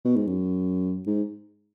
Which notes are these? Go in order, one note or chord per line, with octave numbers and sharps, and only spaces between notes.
B2
G#2
F#2
G#2